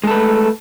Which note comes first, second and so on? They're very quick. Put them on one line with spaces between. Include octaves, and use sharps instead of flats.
G#3 A4 B4 A3